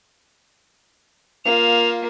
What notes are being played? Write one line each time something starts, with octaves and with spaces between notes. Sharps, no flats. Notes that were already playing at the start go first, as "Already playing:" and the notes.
A#3 F4 F7